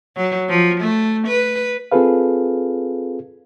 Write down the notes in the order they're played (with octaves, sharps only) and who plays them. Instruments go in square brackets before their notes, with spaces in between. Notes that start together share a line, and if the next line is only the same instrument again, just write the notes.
[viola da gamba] F#3
F3
A3
B4
[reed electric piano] C4 F4 G#4 A4 B4 F5